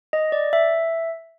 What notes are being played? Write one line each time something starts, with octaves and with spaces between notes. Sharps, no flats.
D#5
D5
E5